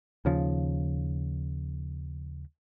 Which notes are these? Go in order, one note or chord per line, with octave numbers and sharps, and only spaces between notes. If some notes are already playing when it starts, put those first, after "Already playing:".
D#2 C#3 F3